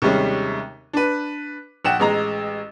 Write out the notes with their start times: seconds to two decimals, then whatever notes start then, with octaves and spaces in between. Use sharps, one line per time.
0.02 D#2 C3 G3 G#3 C#4
0.93 D4 B4
1.85 A#1 F#5 G5 E7
2.00 A1 G#3 A#5